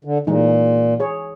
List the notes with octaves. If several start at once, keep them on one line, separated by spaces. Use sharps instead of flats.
D3
A#2 E3 G#3 D#4
G#4 C#5